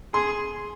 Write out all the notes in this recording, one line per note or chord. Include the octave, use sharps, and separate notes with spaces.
G#4 C6